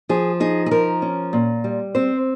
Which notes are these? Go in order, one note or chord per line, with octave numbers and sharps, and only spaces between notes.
F3 G#4
D#4 G#4
G#4
F3 A#4
C#4
A#2
G3
C4 C5